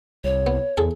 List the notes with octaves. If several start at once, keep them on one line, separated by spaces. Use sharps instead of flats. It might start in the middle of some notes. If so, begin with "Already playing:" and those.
C2 C#5
B3
E2 G#4 A4